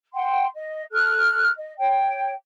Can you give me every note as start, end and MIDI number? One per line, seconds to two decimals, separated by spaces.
0.14 0.45 78
0.14 0.45 79
0.14 0.45 84
0.54 0.83 75
0.92 1.50 69
0.92 1.50 89
0.92 1.50 90
1.56 1.72 75
1.79 2.32 73
1.79 2.32 79